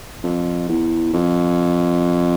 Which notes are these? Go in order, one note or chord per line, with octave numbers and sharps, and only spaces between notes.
F2
E2
F2